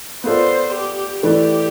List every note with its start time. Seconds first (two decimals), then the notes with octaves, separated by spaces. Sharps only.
0.24 B3 F4 A4 C5 D5
0.74 G4
1.23 E3 A3 E4 G4 B4 D5